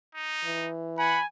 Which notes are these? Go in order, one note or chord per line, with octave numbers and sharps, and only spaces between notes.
D#4
E3
F#5 G#5 B5